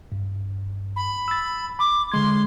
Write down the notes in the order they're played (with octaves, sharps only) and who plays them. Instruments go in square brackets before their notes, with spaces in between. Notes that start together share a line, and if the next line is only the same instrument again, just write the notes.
[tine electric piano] G2
[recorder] B5
[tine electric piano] E6 A6
[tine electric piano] B5 [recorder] D6
[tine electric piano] D3 G#3 G#6 [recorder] C6